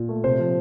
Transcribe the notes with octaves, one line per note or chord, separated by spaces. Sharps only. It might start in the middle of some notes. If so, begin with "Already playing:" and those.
Already playing: A#2
A3
C3 C5
F3